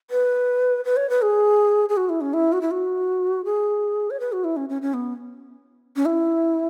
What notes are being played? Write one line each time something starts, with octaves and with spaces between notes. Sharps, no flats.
B4
B4
C#5
B4
G#4
G#4
F#4
E4
C#4
E4
F#4
E4
F#4
G#4
C#5
B4
F#4
E4
C#4
C#4
C#4
B3
C#4
E4